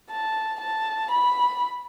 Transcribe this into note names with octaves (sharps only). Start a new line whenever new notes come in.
A5
A5
B5